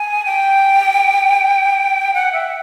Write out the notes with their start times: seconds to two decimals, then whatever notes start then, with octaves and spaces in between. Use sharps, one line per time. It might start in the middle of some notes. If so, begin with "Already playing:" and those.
Already playing: G#5
0.25 G5
2.14 F#5
2.33 E5